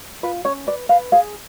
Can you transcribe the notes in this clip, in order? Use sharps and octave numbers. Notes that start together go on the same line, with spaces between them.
F4 B4
C#4 C#5
B4 D5
B4 F5
G#4 F5